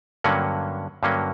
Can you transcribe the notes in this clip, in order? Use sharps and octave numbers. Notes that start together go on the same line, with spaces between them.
G2 D3 F#3 A#3 C#4 F#5
G2 D3 F#3 A#3 C#4